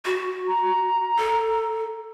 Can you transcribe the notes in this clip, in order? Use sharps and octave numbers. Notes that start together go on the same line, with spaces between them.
F#4
A#5
A4